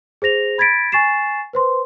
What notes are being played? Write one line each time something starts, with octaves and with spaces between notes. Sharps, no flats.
G#4 C5 A#6 F7
B5 G#6 A6 B6 D7
G#5 C#6 A6 C7 E7
B4 C5 C6